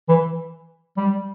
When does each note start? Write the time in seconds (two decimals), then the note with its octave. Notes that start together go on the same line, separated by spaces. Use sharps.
0.09 E3
0.97 G3